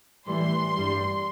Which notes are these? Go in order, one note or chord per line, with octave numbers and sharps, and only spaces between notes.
A2 E3 G3 C6
G2 G3